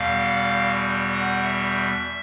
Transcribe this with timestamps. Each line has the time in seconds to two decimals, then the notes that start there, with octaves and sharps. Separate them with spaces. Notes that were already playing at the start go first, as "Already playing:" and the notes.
Already playing: E2 B2 G3 F5
1.13 F#5
1.42 E5